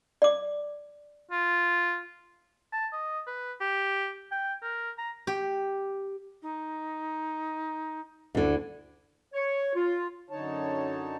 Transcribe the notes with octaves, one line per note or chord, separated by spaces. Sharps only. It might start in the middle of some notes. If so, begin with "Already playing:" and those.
D5 D6
F4
A5
D#5
B4
G4
G5
A#4
A#5
G4
D#4
D2 D3 E4
C#5
F4
F#2 D3 D#4 C#5 A5